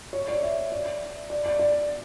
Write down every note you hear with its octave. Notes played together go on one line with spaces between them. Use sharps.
C#5
D5
E5
D5
D5
D5
D5